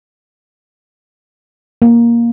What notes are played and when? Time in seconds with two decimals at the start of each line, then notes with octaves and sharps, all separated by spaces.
1.82 A#3